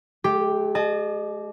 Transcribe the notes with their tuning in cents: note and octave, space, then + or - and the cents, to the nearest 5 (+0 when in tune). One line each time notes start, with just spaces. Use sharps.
G#3 +45 G4 +0
D#5 -30 A5 -45